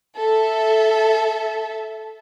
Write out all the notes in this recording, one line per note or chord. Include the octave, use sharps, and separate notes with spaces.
A4 E5